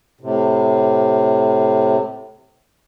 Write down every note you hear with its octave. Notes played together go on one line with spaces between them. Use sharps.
A2 C3